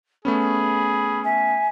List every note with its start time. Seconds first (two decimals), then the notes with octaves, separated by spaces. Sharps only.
0.25 A3 B3 C#4 G#4 B5
1.24 E5 G#5